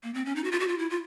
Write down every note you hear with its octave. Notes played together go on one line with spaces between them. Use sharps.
A#3
C4
C#4
D#4
F#4
F4
F#4
F4
E4
F4